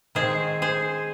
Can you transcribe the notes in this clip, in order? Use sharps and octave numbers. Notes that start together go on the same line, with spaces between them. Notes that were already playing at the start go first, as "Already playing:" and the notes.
D#3 G#3 C4 G#4 C5
G#4 C5